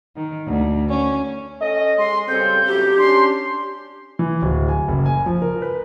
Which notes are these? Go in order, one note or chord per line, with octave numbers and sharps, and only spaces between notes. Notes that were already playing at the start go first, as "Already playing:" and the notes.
D#3
D2
C#4
C#4 A4 D#5
G#3 C6
C#3 G3 C4 A4 G6
A2 C#3 F#3 G4
C#4 D4 C6
E3
D1
G#5
F#1
G#5
F3
A#4
B4